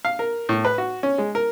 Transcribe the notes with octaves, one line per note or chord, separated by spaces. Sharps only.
F5
A#4
A2
B4
F#4
C#4
G#3
A#4